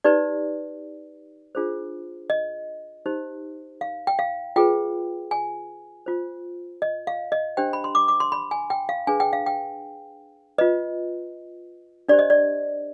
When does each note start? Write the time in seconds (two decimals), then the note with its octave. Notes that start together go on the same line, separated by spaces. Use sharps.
0.04 D#4 G4 B4 D5
1.55 D4 F4 G#4 C5
2.30 D#5
3.06 D#4 G4 C5
3.81 F5
4.07 G5
4.19 F5
4.56 F4 G#4 B4 G5
5.31 G#5
6.06 F4 C5
6.82 D#5
7.07 F5
7.32 D#5
7.57 D4 G4 C5 G5
7.73 B5
7.84 C6
7.95 D6
8.08 D6
8.20 C6
8.32 B5
8.51 G#5
8.70 G5
8.89 F5
9.07 D4 G#4 B4 G#5
9.20 G5
9.33 F5
9.46 G5
10.58 F4 B4 D#5
12.09 D4 G4 C5 D5
12.19 D#5
12.30 D5